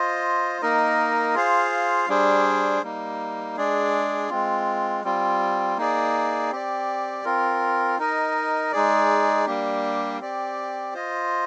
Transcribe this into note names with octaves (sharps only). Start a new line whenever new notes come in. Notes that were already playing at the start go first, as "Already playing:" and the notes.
Already playing: F4 C5 D#5
A#3 D#4 A#4 D#5
F4 G#4 C5 F5
G3 D4 G#4 C5
G3 A#3 D#4
G#3 D4 G#4 D5
G#3 C4 F4
G3 C4 F4
A#3 D#4 G#4 D5
C4 G4 D5
C4 F4 A#4
D#4 A#4 D#5
G#3 D#4 G#4 D5
G3 A#3 D4 G4
C4 G4 D5
F4 C5 D#5